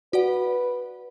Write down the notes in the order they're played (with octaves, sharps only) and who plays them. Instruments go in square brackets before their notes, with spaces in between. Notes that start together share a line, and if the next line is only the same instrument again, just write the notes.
[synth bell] F#4 D5 F#5 [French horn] B4